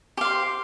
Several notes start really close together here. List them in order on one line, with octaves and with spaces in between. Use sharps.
G4 F5 C5